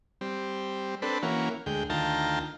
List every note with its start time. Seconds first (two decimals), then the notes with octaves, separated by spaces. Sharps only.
0.21 G3 C4
1.02 C4 D4 A4 B4
1.23 E3 A#3 C#4 F#4
1.66 D2 G#3 G5
1.90 D2 D#3 F4 G5 A5 A#5